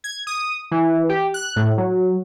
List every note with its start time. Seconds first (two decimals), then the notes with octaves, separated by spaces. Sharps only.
0.04 G#6
0.27 D#6
0.71 E3
1.09 G4
1.34 F#6
1.56 A2
1.78 F#3